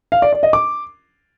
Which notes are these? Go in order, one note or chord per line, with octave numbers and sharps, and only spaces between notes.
F5
D5
D5
D#5
D6